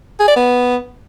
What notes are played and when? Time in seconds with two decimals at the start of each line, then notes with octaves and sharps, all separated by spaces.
0.20 G#4
0.28 D5
0.36 B3